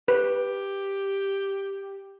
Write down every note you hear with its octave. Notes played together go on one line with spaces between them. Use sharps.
G4 B4